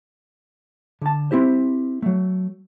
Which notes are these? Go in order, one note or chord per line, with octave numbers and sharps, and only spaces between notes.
D3 A5
C4 E4 G4 C5
F#3 A3